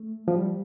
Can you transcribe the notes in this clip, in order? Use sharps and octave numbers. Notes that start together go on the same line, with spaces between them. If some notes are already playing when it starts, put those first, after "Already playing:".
Already playing: A3
F3
G3